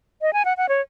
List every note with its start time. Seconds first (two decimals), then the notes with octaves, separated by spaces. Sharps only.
0.22 D#5
0.33 G#5
0.45 F#5
0.57 F#5
0.69 C#5